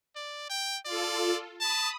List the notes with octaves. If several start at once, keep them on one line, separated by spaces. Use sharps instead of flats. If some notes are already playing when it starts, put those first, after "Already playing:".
D5
G5
F4 A4 D5
A5 B5 D#6